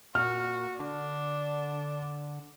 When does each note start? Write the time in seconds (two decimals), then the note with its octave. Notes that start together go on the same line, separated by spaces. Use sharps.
0.15 A#2 F#4 F6
0.80 D3 D4